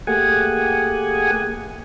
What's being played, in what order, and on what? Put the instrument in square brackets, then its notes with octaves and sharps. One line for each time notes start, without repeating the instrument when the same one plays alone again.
[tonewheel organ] A3 A#3 G4 G#4 F#5 G#5